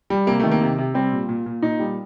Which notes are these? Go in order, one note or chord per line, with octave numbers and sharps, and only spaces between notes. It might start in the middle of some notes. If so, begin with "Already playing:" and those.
G3
C3 A#3
D#3 A3
A#3
C3
C3
G3 C4
A#2
A#2
A#2
A#2 D#4
G3